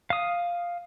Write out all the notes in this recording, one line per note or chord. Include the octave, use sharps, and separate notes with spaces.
F5 D#6